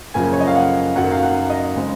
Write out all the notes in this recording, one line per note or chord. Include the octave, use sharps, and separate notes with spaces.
F#2 C#3 F3 A#3 G#5
C#5
D#5
F5
F#5
F#2 D#3 F#3 F#5
F5
F#5
D#5
C#3 G#3 C4